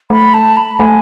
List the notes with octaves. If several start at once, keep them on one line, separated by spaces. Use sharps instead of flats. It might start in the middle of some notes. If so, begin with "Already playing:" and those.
A3 B5
A5
B5
A3 G#5